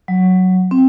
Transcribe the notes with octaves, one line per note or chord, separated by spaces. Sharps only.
F#3
C4